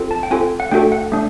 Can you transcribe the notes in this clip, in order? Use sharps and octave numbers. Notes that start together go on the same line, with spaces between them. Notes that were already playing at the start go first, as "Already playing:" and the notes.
Already playing: C4 F4 A4
A5
G5
C4 F4 A4 G#5
F#5
A3 D4 F#4 A4 G5
F#5
A3 D4